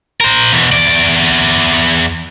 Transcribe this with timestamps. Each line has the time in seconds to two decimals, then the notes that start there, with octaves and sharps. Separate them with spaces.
0.21 A#4 C5
0.53 B2 E3
0.72 E2 D5